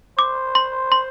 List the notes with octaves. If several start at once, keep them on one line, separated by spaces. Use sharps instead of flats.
C5 D6
C6
C6